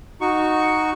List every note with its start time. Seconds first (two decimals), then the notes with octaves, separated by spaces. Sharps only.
0.21 D#4 F#4 C#6